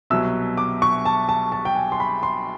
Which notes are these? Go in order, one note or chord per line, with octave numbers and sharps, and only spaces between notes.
C2 B2 F#3 E6
D6
C#6
A5
A5
A5
G5
G#5
C6
B5
C6